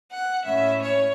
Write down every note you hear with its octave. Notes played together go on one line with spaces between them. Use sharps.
F#5
A2 A3 C#4 E4 E5
C#5